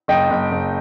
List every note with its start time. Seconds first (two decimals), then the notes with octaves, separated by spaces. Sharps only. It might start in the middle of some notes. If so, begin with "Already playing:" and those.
0.08 F#1 D#5 G5
0.30 F#1
0.52 F#1